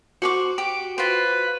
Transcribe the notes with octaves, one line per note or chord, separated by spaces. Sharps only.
F#4 C5 C#6 D6
G4 D6
F4 B4 C5